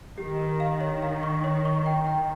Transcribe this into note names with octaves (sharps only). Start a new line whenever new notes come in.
D#3 G4
A#4
F5
C#5
F5
C#6
C#5
C#6
G5
G5